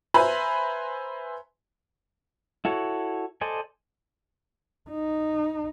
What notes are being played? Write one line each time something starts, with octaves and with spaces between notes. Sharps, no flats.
B4 C5 E5 G#5 A#5 B5
E4 F#4 A4 C#5
A4 C5 D5 D#5 G#5
D#4